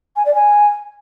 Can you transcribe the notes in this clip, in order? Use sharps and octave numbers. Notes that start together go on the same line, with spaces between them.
G#5
D5
G#5